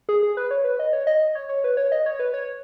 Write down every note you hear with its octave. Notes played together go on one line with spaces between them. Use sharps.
G#4
G#4
B4
C#5
B4
D#5
C#5
D#5
D#5
C#5
C#5
B4
C#5
D#5
C#5
B4
C#5